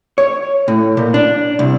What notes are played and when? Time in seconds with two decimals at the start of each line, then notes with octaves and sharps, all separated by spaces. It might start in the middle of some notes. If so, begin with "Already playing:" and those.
0.18 C#5
0.68 A2
0.97 A#2
1.14 D4
1.59 C2